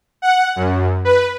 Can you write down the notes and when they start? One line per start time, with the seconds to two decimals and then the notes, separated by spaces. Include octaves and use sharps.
0.22 F#5
0.56 F#2
1.05 B4